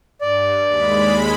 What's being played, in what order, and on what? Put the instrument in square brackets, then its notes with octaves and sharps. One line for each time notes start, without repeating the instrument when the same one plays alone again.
[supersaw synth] G2 [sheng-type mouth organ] D5
[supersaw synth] D#2 G#3 B5